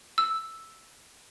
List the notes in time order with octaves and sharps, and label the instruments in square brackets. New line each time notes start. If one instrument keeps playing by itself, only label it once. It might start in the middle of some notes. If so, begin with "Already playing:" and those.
[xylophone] E6